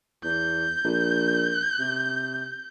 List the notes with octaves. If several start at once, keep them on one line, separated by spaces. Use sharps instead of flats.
E2 G6
A#1
C3